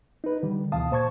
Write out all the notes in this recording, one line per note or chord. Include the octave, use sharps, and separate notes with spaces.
D#4 B4
D3 D#3 G3
D2 B2 E3 F5 A5 D#6
A#2 C5 A5 C#6 G#6